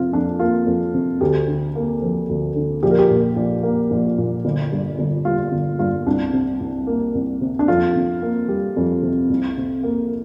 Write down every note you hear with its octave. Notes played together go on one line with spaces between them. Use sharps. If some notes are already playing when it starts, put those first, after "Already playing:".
Already playing: F2 C3 F4
F2 D4
A#3 F4
F2
C3
D2 G4
D3
A#3
F3
D2
D3
A#1 G4
A#4
G4
A#2
A#1
A#3
A#1
A#2
G1
G2
G1
G3 F4
G1
G2 F4
C2 D4
C3
C2
A#3
C2
C3
D4
F2 F4
C3
A#3
G3
F2
C3
C2
C3
A#3